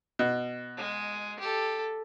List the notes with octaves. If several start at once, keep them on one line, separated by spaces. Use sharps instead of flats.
B2
G#3
G4 A4